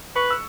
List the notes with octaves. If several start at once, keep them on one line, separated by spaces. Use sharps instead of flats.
B4 C#6
E6